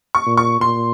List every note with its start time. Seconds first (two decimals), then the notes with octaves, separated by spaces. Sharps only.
0.15 C#6
0.26 A#2
0.37 C#6
0.60 A#2 C6